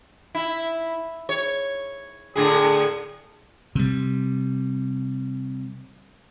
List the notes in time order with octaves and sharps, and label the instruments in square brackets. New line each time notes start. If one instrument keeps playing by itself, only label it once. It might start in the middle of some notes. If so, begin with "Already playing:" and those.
[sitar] E4
C#5
A2 D3 G#4
[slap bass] C3 G3